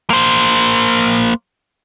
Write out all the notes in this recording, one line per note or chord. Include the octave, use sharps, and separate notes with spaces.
A#3 C5